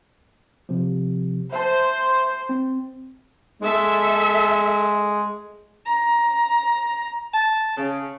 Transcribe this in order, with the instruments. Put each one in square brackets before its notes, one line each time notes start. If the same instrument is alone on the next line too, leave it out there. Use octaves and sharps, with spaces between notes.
[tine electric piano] C3 F3
[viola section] C5 [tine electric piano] E5 A5
[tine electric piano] C4
[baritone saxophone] G#3 [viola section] A4 E5
[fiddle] A#5
[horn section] A5
C#3